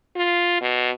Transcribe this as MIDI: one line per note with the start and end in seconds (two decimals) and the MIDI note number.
0.16 0.57 65
0.61 0.91 47